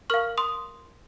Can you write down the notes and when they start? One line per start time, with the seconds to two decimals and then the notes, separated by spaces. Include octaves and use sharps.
0.10 A#4 F5 C#6 F6
0.38 C6 D#6